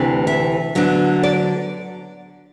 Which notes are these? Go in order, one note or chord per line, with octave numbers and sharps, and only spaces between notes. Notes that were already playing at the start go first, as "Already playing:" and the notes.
Already playing: D2 C3 E3 A3 D4
E5
D3 F#3 B3 D4
D5